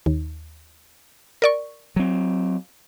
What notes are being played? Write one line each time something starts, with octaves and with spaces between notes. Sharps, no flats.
D#2
A#4 D5 C#6
F#3 C4